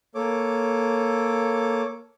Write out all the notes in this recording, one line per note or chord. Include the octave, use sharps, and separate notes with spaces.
A#3 A4 C#5 D6